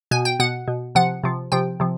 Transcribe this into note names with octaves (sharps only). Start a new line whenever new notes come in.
B2 G#5
G5
B2 F#5
B2
C3 F3 F#5
C3 F3
C3 F3 G5
C3 F3